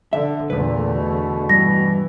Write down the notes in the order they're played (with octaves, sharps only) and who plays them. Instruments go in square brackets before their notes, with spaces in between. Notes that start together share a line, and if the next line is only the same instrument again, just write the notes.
[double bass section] D3 [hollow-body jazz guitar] E5
[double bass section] E2 D3 A3 [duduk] A#2 [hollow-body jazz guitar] B4
[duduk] B2
[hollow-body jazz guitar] G2 [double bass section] E3 [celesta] A#6